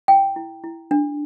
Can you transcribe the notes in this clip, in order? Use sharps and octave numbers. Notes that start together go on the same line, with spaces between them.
E4 G5
E4
E4
D4